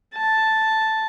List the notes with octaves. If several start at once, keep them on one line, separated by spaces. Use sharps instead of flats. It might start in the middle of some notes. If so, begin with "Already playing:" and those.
A5